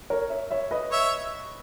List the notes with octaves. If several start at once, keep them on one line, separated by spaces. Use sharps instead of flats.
A#4 C#5
C#5 E5
C#5 E5
B4 D#5
C#5 E5